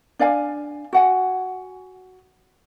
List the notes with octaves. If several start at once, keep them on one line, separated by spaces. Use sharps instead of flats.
D4 D5 F5 G#5
F#4 F#5 G#5